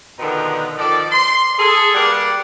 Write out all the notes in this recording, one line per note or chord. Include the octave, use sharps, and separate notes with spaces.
B2 D3 D#3 F3 B3 A#5
D#3 F3 A4 D5
C6
G#4 A4
G3 A#3 G4 B4 D5 F#5